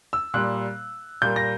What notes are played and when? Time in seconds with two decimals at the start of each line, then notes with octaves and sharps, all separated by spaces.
0.13 E6
0.34 A#2 G3 A#3 F#6
1.22 A#2 G3 A#3 G6
1.36 A#6